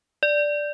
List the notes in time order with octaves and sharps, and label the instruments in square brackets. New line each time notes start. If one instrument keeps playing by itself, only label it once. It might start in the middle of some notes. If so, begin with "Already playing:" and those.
[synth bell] D5